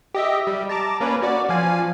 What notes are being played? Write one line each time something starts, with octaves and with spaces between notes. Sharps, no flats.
G4 D#5 E5
G3
A5 A#5 D6
A#3 C#4 B4
F#4 D5
F3 F5 G#5